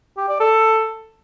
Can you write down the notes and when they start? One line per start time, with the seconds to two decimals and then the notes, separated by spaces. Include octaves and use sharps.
0.17 G4
0.29 D5
0.40 A4